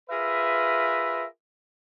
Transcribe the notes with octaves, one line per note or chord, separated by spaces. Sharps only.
F4 G#4 A#4 B4 E5